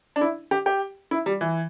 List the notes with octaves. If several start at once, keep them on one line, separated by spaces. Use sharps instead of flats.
D4
E4
G4
G4
E4
G3
E3